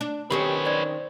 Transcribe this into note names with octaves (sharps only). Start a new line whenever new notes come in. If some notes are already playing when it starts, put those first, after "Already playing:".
D4
D#3 C4 C#4 G4 A#4 B4 C#5
C5 D5 G#6